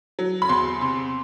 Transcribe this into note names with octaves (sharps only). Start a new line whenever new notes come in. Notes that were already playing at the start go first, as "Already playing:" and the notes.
F#3
B5
E2 C6
C3